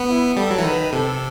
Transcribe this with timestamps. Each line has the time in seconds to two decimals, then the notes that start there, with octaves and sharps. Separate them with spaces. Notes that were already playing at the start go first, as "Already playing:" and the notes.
Already playing: B3
0.09 E4
0.37 G3 A4
0.51 F#3
0.58 E3
0.64 D#3 B4
0.93 C3 A4